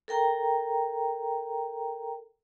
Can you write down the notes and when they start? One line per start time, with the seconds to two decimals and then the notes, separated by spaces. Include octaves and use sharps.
0.08 A4 A#4 G5 A#5